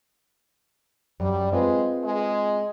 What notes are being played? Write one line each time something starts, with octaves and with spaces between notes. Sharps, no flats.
F#2 G3
G#3 C4 F4 B4
G#3